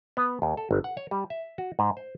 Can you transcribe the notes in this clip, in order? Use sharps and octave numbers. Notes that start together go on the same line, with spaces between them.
B3
D#2
A4
G1
F#5
C#5
G3
E5
F#4
G#2
C5